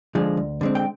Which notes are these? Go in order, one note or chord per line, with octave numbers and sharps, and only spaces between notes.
D3 F3 G#3
D2
D3 G#3 C4
G5